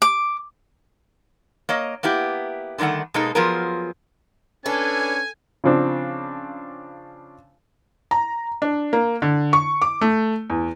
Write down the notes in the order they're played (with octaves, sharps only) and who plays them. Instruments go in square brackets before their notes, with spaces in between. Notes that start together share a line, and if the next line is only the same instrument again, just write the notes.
[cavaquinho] D6
[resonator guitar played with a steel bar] A#3 C#5 D#5
A#3 B3 E4 G4
D3 D#3 G3 A3 F#5
B2 G#3 A#3 D#4 A4
F3 F#3 B3 F4 G#4 A#4
[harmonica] C#4 D4 B4 [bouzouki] A4 [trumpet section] G#5
[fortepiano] C#3 F3 C4 D4
[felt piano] A#5
D4
A#3
D3
C#6
D6
A3
E2